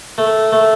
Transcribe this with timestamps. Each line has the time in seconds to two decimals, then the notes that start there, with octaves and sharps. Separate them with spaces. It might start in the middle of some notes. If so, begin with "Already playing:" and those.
0.18 A3
0.53 A3